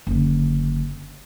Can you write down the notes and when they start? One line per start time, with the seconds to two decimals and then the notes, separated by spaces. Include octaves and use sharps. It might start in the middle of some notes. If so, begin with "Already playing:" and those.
0.07 F#1 D3